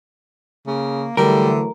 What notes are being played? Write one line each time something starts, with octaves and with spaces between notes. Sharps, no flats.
C#3 A#3
D3 E3 F#3 G3 A3 A#4